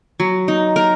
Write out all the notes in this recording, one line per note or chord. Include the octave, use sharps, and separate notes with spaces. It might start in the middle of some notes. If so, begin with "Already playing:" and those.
F#3
D#4
A#4